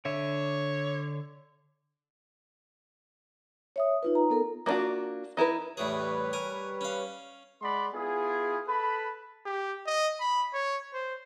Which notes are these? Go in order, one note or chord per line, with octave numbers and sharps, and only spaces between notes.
D3 C#5 E5
C#5 E5 D#6
D#4 F4 B4
A#5
B3 A4 A#4
A#3 B3 D4 F4 F#4
D#4 E4 A#4 B4
E2 A2 G3 G#4 B4 C#5
A#4 G#5
C#4 F5
G#3 D5 D#5 F#5 B5 C6
B3 E4 F4 G#4
A4 B4 A5 B5
G4
D#5
B5
C#5
C5